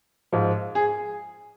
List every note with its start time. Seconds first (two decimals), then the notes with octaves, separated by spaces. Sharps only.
0.33 G#2 F3
0.75 G#4